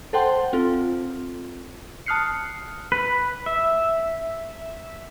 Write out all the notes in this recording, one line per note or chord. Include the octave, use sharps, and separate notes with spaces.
A4 C5 F#5 G5 A5 C6
C4 F4 A4
A5 D#6 F6 F#6 C7 C#7
B4
E5